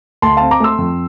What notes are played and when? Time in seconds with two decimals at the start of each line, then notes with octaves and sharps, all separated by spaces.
0.22 D2 A5 C6
0.37 C4 F5 A5
0.51 A#5 D6
0.60 A3 C6 E6
0.78 F2